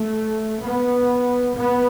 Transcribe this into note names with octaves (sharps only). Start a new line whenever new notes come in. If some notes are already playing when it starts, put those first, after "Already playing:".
Already playing: A3
B3
B3